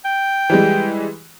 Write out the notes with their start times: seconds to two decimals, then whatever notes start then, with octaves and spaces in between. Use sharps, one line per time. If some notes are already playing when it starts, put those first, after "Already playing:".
0.05 G5
0.50 E3 G3 G#3